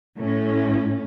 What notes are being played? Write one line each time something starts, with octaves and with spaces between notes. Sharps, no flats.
A2 C#4